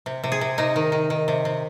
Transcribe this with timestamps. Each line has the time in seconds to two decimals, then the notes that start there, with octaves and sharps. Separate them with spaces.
0.06 C3
0.24 C3
0.32 G#4
0.41 C3
0.58 C3 D#4
0.76 D#3
0.92 D#3
1.10 D#3
1.28 C3
1.45 C3